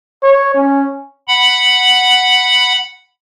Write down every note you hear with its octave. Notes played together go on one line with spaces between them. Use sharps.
C#5
C#4
F#5 B5